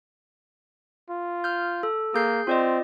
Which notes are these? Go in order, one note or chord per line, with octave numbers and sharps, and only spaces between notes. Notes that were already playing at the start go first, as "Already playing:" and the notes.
F4
F6 G6
A4
A#3 G#4 G6 C7
C4 F4 D5 D#5